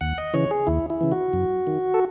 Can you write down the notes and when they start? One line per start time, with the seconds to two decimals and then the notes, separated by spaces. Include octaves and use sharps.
0.01 D#2 F#5
0.18 D#5
0.34 C#3 E3 C#5
0.51 G#4
0.67 D#2 E4
0.90 E4
1.01 C#3 E3
1.12 F#4
1.33 F#2
1.67 D#3
1.94 A4